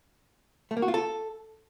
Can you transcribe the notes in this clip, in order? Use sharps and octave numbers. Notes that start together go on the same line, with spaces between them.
A3
A#3
F#4
F4
A4